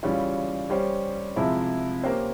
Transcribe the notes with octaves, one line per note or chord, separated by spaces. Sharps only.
C#3 E3 G3 C#4 F4
G3 C#4 G4 C5
C3 F3 G#3 E4
A#3 C#4 G4 C5